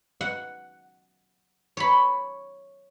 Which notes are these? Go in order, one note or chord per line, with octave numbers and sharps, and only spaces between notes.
F#5
C#5 B5